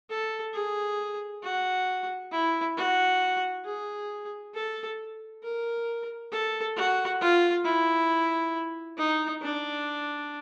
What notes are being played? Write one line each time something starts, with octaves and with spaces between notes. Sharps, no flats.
A4
G#4
F#4
E4
F#4
G#4
A4
A#4
A4
F#4
F4
E4
D#4
D4